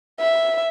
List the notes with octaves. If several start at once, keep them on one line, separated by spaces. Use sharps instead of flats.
E5